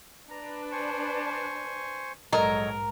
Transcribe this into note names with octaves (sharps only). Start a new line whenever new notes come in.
D4 B4 A#5
C5 G#5 C#6
A#1 G#2 F#3 A4 A#4 C#5 D#5